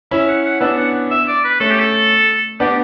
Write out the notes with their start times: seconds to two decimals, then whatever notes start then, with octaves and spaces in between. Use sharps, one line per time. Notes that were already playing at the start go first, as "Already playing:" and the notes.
0.11 C#4 E4 E5
0.28 F#5
0.45 F#5
0.61 B3 D4 E5
0.78 F#5
1.11 E5
1.28 D5
1.45 B4
1.60 A3 C#4 A4
1.71 G4
1.80 A4
2.60 B3 D4 G4